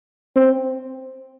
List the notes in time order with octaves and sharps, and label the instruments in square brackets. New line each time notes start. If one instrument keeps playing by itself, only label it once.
[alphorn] C4